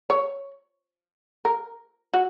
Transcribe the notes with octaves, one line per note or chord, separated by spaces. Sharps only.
C#5
A#4
F#4